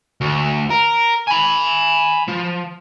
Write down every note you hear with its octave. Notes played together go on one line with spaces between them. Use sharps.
D2
A#4
G#5 B5
F3